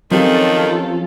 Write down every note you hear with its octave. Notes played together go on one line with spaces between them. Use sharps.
D#3 F3 F#3 C4 C#4 F4 G4 A4